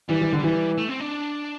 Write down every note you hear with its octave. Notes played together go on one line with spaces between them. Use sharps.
E3 G3
E3
D3
E3
A3
C4
D4